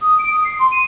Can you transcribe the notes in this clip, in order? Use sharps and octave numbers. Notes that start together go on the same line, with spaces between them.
D#6
D7
D#6
C7
C6
D#7